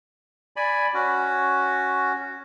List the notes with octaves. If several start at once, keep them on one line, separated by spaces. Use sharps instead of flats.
D5 G#5 B5
C#4 F#4